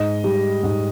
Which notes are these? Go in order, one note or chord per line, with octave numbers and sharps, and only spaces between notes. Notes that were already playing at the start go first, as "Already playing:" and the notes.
Already playing: G#2 D#5
G3
G#2